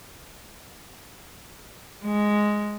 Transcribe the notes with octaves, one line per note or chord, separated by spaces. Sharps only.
G#3